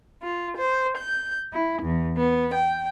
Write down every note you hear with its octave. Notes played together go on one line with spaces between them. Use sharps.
F4
C5
G6
E4
E2
B3
G5